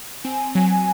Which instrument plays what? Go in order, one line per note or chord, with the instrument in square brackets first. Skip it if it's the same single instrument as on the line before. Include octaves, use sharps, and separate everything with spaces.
[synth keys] C4 [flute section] G#5
[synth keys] F#3
[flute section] G#5